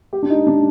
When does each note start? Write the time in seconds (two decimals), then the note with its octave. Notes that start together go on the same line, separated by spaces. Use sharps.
0.13 G4
0.23 D4
0.30 D#4
0.47 D4